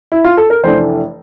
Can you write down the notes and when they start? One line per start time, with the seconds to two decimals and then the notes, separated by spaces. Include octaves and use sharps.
0.12 E4
0.24 F4
0.37 A4
0.50 A#4
0.64 F1 E3 A3 D4 C5